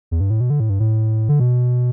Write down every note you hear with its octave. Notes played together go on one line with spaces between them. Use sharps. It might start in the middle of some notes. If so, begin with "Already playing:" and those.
E2
G2
A2
B2
D3
A2
G2
A2
D3
B2